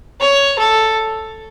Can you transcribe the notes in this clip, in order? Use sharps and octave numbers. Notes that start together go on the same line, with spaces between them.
C#5
A4